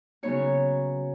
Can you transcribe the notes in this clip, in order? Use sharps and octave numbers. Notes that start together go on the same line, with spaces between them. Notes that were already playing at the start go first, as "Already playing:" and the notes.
C#3 F#3 B3 D#4 C#5